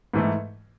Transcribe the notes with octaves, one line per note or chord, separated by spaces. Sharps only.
G#2 E3 A3